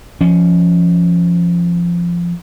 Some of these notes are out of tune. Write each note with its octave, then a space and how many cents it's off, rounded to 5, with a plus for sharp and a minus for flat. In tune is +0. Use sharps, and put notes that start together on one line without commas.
F3 -15 C#4 +0